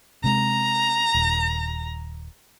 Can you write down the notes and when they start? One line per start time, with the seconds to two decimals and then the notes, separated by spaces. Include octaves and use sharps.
0.24 C3 G#3 A#5
1.14 D#1